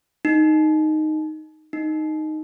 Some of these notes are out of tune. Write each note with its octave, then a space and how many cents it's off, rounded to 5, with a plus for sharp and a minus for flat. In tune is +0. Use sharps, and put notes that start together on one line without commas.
D#4 -5
D#4 -5